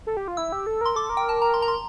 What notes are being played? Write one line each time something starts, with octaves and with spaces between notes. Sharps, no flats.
A4
G4
F4
E4 E6
G4
A4
A#4 C6
A4 D6
A#4
G5
A5
A#5
C6
A#5
C6